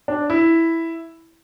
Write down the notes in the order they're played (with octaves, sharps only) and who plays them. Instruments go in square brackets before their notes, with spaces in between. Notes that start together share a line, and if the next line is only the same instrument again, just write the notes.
[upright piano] D4
E4